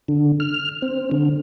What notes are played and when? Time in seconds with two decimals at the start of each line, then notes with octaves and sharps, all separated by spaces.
0.08 D3
0.40 F6
0.82 C4
1.11 D3